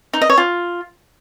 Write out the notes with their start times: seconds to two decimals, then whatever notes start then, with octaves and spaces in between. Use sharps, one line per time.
0.13 D#4
0.21 D#5
0.29 C#5
0.38 F4